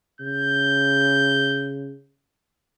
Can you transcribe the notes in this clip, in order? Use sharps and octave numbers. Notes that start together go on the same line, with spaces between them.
C#3 G6